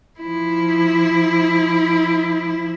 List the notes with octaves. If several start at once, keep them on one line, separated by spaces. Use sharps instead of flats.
F3 E4